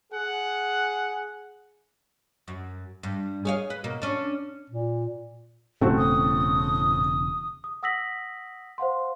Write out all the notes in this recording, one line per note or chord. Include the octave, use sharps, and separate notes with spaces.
G#4 F#5
F#2
G2
G#4 C#5 F5
B4
B2 A#3
C#4 D4
A#2
E1 A2 C#3 A3 C4 F#4
D#6
D#6
F#5 D#6 E6 A#6 B6 F#7
C5 F5 F#5 C6